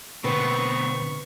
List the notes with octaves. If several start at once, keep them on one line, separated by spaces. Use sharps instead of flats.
B2 D3 B3 C4 B4 C#6